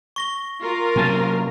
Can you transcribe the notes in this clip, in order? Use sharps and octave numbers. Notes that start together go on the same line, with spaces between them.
C#6 A#6 G7
F4 A#4
C3 F#3 A#3 C#4 G#5 A5